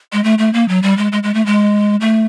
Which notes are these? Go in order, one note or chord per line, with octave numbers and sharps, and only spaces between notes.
G#3
A3
A3
A#3
F#3
G3
G#3
G#3
G#3
A3
G#3
A3